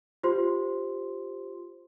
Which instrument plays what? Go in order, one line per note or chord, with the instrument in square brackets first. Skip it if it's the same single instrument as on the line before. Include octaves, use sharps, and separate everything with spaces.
[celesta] F4 G4 C5 C6